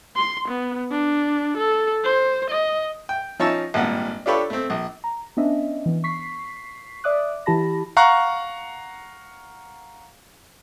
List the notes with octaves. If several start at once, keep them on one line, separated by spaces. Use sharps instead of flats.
C6
B3
D4
A4
C5
D#5
G5
F3 C#4 D#4 A5 C#6 E6
G#1 G2 A#2 F#5
D4 F4 G4 A4 B4 C#5
A3 C4
A#1
A#5
B3 C#4 D4 D#5 E5
E3 B3
C#6 B6 C7
D5 E5 D6 D#6 F#6
E3 E4 G4 A5 B5 A#6
F5 F#5 A#5 C#6 F#6